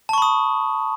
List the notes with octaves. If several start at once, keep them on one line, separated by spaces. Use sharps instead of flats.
A5 B5 C#6 D#6